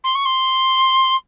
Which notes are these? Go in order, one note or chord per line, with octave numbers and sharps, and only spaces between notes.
C6
C#6
C6